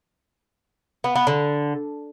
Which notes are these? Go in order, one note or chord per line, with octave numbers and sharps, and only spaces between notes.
B3
B3
D3